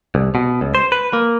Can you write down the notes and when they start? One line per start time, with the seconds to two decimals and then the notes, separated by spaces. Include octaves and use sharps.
0.15 C2
0.35 B2
0.61 C#2
0.75 C5
0.92 B4
1.13 A#3